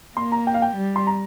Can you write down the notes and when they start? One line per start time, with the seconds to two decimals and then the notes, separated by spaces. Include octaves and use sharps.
0.17 A#3 C6
0.32 A#5
0.47 G5
0.54 F5
0.62 G5
0.77 G3
0.96 C6
1.07 A#5